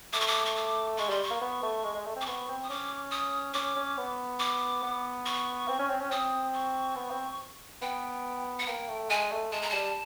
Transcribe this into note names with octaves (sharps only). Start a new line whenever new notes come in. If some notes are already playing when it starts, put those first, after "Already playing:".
A3 D6
C#6
D6
C#6
D6
G#3 C#6
G3 C6
C#6
A#3
B3
A3
G#3
G#3
A3
C4
D6
B3 C#6
C4
D#6
C#4 D6
D#6
C#4 D6
C#4
B3
D6
B3
C#6
C4
C#4
C4
C#4
C4 D#6
C#6
B3
C4
B3 G5
F#5
A#3 G5
A3
G#3 G#5
A3
G#3 A5
A#5
G3 A5